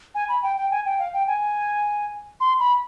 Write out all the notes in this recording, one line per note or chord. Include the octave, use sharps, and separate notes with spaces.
G#5
B5
G5
G5
G#5
G5
F5
G5
G#5
C6
B5